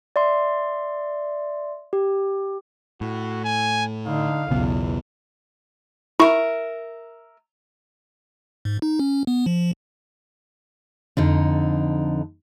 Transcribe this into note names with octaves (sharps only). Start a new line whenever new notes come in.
D5 E5 C6
G4
A2 F#4
G#5
D3 D#4 F5
B1 E2 C#3 B3
E4 A#4 E5 C#6
G#2
D#4
C#4
B3
F3
F2 D3 D#4